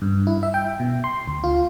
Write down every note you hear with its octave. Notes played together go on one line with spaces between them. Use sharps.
G2
E4
E5
G5
B2
C6
D2
F4